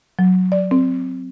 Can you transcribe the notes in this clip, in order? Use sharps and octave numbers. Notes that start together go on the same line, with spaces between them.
F#3
D5
C4